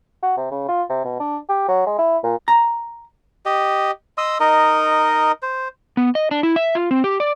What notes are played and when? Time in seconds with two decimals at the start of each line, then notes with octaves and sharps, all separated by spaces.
0.23 F#4
0.37 C3
0.51 C#3
0.69 F4
0.90 C3
1.05 B2
1.20 D4
1.49 G4
1.68 F#3
1.86 G#3
1.98 E4
2.23 A#2
2.48 A#5
3.46 G4 D#5
4.18 D#5 C6 D#6 E6
4.40 D#4 A#4 D#5
5.42 C5
5.97 B3
6.15 D#5
6.31 D4
6.43 E4
6.56 E5
6.75 F4
6.91 C4
7.04 G4
7.20 D5